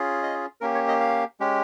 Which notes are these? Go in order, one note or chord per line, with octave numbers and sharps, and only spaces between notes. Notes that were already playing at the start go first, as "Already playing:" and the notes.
Already playing: C#4 F4 G#4
D#5
A#3 C#4 G4 A#4
C#5
D#5
F5
G#3 C#4 G4